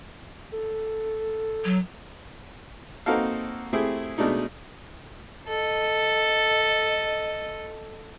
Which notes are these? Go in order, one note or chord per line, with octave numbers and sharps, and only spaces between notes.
A4
F#3
A#3 C4 D#4 F#4 A4 F5
A3 C4 E4 G4 G#4
B2 G#3 A3 D4 D#4
A4 D#5